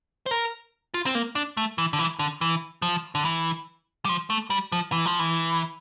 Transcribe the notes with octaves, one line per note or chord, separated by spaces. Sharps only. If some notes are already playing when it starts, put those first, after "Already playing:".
C5
A#4
F4
C4
A#3
D4
A3
E3
D3
E3
D3
E3
F3
D3
E3
G3
F3
A3
G3
F3
E3
F3
E3